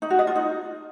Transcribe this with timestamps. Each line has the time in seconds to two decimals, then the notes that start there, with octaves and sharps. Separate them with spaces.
0.02 D#4
0.10 F#4
0.19 D#5
0.27 F4
0.36 D#4